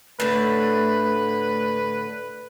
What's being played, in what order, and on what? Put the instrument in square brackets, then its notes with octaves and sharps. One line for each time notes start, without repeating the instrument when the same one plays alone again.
[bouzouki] A2 D3 [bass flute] A3 [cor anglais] B4